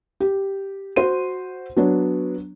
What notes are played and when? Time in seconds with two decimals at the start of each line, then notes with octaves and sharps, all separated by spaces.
0.20 G4
0.96 F#4 C5 C6 D#7
1.77 F#3 B3 D4 C#5